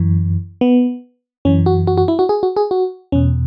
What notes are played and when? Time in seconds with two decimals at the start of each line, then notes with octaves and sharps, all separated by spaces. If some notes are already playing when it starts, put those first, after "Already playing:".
Already playing: F#2 E3
0.61 B3
1.45 F#2 E3 C#4
1.66 F#4
1.87 F#4
1.97 F#4
2.08 E4
2.19 F#4
2.29 G#4
2.43 F#4
2.57 G#4
2.71 F#4
3.12 E2 B2 C#4